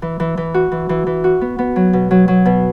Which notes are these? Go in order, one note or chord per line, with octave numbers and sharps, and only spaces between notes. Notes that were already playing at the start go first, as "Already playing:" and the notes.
E3
E3
E3
F#4
E3
E3
E3
F#4
B3
B3
F#3
B2
F#3
F#3
B2